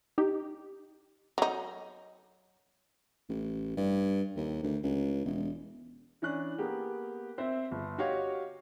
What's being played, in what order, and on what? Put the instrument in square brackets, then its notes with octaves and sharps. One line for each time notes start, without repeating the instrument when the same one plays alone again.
[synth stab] D#4 G4
[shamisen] F#3 D#4
[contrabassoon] A1
G2
D#2
D2
C#2
E1
[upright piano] E3 C#4 D4 F#6
A#3 B3 G4 G#4
C4 C5 E5
G1
F#4 G4 C#5 D#5 F5 G5